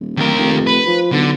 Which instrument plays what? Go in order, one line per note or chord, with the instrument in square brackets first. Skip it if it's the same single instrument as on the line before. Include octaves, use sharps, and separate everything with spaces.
[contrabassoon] D#1
[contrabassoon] D1 [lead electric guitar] D#2 A#4
[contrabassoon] F1
[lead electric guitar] B4
[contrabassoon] F3
[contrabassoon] B1 [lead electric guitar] D3